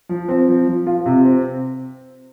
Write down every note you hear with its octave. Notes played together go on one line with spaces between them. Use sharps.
F3
C4
F3
F3
F4
C3
C4